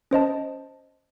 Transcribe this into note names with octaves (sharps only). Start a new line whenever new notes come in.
C#4 C5 D#5 A5